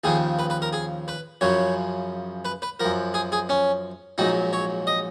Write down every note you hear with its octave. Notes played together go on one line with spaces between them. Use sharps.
D#2 C#3 F3 G#4
B4
B4
A#4
G#4
B4
F#2 C#3 F3 C#5
B4
B4
F#2 F3 A#4
G#4
G#4
C#4
A#1 G#2 F#3 D#4
C#5
D#5